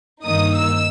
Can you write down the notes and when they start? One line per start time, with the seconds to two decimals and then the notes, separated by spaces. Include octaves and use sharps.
0.24 G2 D#3 A#3 D#4 D#6
0.55 E6